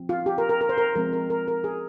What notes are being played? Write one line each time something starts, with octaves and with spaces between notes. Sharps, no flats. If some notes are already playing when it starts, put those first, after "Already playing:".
Already playing: F3 C4
F4
G4
A#4
A#4
A#4
C5
A#4
F3 G#3 C4 A#4
A#4
A#4
A#4
G#4